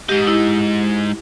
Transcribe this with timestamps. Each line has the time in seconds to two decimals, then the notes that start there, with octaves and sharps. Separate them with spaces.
0.09 G#2 G4 D#5
0.27 E4